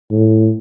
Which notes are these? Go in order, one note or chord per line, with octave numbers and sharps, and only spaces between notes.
A2